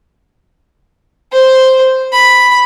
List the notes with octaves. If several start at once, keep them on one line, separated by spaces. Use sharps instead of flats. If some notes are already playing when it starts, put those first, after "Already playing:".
C5
B5